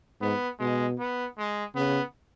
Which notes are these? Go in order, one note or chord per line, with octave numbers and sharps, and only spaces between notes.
G#2 B3
B2 G#3
B3
G#3
C#3 B3